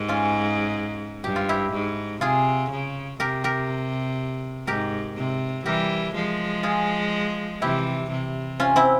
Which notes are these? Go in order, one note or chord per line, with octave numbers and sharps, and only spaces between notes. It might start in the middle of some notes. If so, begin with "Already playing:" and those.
Already playing: G#2 G4 A#4
C#4 F4
G2 G4
F4
E4 G4
G#2
C3 F4 G#4
C#3
C3 G4 A#4
G4 A#4
G#2 G4 A#4
C3
E3 G3 G4 A#4
F3 G#3
F4 G#4
C3 E3 E4 G4
C3
C#4 F4
C4 E4